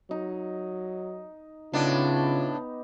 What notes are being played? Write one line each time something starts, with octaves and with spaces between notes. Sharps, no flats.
F#3 D#4
A2 C#3 B3 D4 D#4 F4 G4